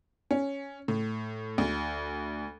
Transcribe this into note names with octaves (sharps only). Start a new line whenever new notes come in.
C#4
A2
D2